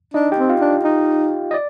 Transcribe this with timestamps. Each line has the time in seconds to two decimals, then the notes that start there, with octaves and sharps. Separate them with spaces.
0.14 D4 D#4 D#5
0.32 G4 G5
0.38 C4
0.49 F4 F5
0.61 D4
0.84 D#4
1.51 D#5
1.54 D5